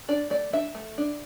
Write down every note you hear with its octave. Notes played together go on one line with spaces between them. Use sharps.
D4 D5
A3 D5
D4 E5
A3
D4